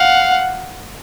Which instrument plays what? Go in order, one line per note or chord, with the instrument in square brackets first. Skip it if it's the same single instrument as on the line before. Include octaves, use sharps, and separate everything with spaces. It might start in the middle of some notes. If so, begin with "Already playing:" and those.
Already playing: [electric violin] F5 [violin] F#5